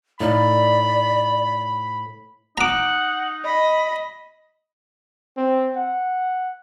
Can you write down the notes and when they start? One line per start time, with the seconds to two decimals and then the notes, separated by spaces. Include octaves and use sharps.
0.20 A2 D#4 D5 F5 B5
2.58 D#4 F#5 A#5 D6
3.45 D#5 B5
5.37 C4
5.76 F#5